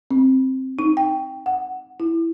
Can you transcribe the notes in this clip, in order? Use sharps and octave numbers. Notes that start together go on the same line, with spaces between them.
C4
D#4
G5
F#5
E4